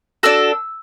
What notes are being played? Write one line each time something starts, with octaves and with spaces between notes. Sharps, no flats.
D4 F#4 A4 E6